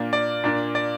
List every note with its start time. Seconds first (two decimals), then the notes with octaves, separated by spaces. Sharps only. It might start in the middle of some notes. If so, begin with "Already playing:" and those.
Already playing: A#2 A#3 D4
0.13 D5
0.44 A#2 A#3 D4
0.75 D5